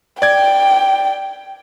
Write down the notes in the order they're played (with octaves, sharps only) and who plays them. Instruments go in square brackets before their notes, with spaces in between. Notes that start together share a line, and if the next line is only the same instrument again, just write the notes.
[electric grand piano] D5 G#6 [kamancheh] G5